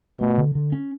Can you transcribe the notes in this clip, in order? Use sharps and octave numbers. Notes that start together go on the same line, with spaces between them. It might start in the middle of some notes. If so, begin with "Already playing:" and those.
B2 A3
D3
D3
C#4